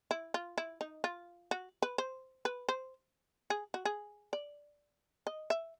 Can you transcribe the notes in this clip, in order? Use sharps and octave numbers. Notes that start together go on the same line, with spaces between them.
E4
F4
E4
D#4
F4
F#4
B4
C5
B4
C5
G#4
F#4
G#4
D5
D#5
E5